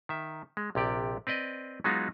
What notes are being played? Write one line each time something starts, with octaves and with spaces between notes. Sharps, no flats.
D#3 E5
G#3
A#1 C3 G4 D5
C4 B4 D5 D#5
F#3 G#3 B3 D#4 F4 F#4